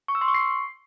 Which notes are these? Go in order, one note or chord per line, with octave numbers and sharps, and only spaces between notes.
C#6
E6
C6
C#6
C7